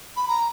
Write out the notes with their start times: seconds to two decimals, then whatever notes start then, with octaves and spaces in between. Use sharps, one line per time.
0.17 B5
0.28 A#5